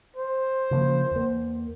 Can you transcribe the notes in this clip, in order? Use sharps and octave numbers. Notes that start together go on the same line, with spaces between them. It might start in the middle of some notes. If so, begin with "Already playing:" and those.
C5
C#3 F3 A#3
E2 A#3